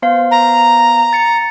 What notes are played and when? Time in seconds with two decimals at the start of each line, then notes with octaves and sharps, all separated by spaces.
0.02 B3 C5 F5
0.31 A#5
1.13 A6 C#7